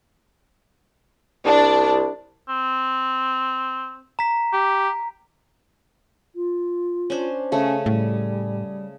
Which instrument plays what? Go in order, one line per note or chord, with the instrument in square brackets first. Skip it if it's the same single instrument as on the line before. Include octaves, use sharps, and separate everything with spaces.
[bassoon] C2 [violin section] D4
[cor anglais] C4
[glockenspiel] A#5 B6
[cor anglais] G4
[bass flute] F4
[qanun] C#4 D4 C5
[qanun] C#3 A3 [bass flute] C#4
[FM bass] A2 [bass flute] G3